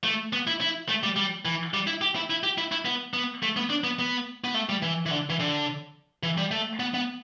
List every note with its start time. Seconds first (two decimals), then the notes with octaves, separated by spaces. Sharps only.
0.04 A3
0.33 B3
0.47 E4
0.61 E4
0.89 A3
1.03 G3
1.16 G3
1.45 E3
1.74 G3
1.87 E4
2.01 G4
2.16 E4
2.30 E4
2.43 G4
2.58 E4
2.72 E4
2.85 B3
3.14 B3
3.43 A3
3.57 B3
3.70 D4
3.84 B3
3.99 B3
4.44 B3
4.54 A3
4.69 G3
4.82 E3
5.06 E3
5.11 D3
5.30 E3
5.40 D3
6.23 E3
6.38 G3
6.51 A3
6.80 B3
6.94 B3